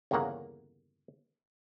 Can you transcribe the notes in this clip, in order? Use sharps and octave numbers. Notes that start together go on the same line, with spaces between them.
G1 E2 C#3 A#3 F#5 A#5